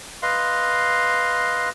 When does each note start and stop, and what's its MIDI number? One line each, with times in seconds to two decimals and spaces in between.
0.23 1.69 71
0.23 1.69 75
0.23 1.69 77
0.23 1.69 84